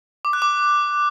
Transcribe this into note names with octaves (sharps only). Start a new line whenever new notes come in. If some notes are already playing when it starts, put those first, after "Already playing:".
D6
F#6
D6